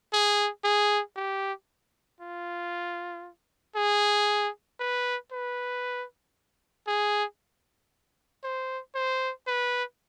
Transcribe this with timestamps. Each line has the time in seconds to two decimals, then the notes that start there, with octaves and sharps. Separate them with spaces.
0.13 G#4
0.64 G#4
1.16 G4
2.20 F4
3.76 G#4
4.80 B4
5.32 B4
6.88 G#4
8.44 C5
8.95 C5
9.47 B4